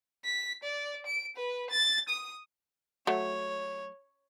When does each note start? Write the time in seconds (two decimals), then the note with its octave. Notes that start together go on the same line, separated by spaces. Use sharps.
0.25 B6
0.63 D5
1.06 D7
1.36 B4
1.70 A6
2.08 D#6
3.07 F#3 A3 C#5